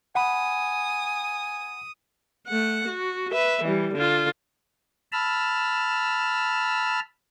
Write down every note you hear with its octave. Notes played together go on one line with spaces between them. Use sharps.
F#5 G#5 B5 D#6
A3 F#5
F#4
B4 E5
E3 G3
D3 F4
A5 B5 E6 F6